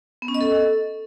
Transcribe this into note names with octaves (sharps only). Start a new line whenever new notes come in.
B3
C#4
D#5
A4